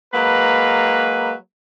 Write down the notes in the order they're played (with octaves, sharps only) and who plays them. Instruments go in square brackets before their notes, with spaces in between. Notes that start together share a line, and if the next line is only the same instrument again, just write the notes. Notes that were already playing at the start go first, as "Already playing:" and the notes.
[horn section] F#3 G#3 A#3 B4